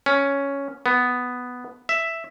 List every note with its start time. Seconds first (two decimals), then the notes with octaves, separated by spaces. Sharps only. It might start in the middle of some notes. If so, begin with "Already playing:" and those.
0.06 C#4
0.86 B3
1.89 E5